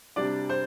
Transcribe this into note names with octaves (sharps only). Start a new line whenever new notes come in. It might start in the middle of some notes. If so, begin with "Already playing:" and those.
C3 G3 D4 D5
C5